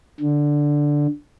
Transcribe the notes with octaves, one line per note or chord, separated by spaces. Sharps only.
D3